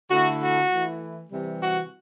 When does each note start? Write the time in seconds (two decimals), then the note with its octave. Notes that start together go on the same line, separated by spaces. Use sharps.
0.11 D3 A3 E4 F#4
0.41 F#4
0.71 E3 A3 E4
1.31 C3 E3 G3
1.61 F#4